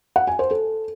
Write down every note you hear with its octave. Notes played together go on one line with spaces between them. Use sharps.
F#5
G#5
C5
A4